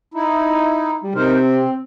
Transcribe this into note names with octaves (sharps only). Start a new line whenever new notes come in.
D#4 E4
G3
C3 D#4 A#4 C5
C4